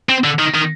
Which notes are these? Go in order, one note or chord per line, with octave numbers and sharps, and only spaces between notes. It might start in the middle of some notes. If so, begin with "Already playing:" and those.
C4
D3
D#3
D#3